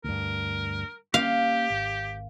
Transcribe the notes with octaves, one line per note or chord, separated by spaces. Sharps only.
D2 G2 A#4
A#3 C#4 G4 F5
G#1